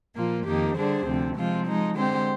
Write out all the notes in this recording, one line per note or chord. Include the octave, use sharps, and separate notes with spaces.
A#2 F3 A#3 F4
F2 D#3 A#3 D#4 G4
D3 G3 D4 G#4 C5
D2 C3 F3 C4
C3 F3 G#3 C4 F4
F3 G#3 D#4
D3 G#3 C4 G4 C5